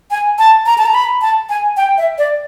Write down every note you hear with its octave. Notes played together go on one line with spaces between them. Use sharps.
G#5
A5
A#5
A5
A#5
B5
A5
G#5
G5
E5
D5